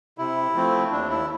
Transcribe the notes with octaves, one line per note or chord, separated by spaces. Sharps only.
C3 E4
F3 A3 C4
D#2 D4
E4